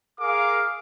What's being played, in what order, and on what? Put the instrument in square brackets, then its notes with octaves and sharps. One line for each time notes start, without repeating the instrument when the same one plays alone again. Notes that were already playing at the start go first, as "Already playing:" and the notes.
[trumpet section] G#4 A#4 F5 D6